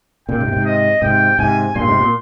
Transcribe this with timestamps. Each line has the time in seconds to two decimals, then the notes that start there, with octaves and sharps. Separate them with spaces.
0.28 A#2 C#3 G5
0.40 G#2 C3
0.48 A#2
0.53 G#2 C3
0.65 D#5
1.02 G#2 C3 G5
1.39 G#2 C3 G#5
1.75 G2 A#2 C6
1.88 G#2 C3
2.00 A#2